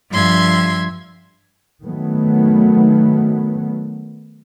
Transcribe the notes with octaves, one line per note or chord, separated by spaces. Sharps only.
G2 F3 E5 C6 G#6
D#3 F#3 A3 B3